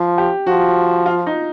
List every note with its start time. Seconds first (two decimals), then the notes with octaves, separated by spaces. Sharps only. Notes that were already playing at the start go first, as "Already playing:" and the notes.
Already playing: F3
0.18 G4
0.47 F3 F#4
1.06 F4
1.27 D#4